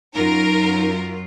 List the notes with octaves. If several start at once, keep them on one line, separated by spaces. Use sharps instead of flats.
F#2 F#3 D#4 F4 A#4